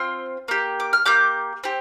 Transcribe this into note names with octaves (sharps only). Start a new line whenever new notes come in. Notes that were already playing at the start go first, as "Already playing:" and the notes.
Already playing: C4 F4 C6 F6
A#3 G4
D6
F6
A#3 G4 D6 G6
C4 G4